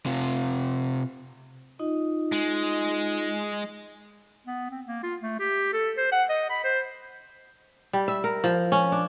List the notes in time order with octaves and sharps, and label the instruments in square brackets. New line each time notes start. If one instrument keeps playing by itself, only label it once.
[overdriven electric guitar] C3 F4
[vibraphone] D#4 F4 D#5
[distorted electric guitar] G#3
[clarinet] B3
C4
A#3
F4
A3
G4
A4
C5
F#5
D#5
B5
C5
[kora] G3
E5
A#4
F3
C#4
D4